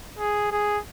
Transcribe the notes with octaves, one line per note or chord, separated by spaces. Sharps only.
G#4
G#4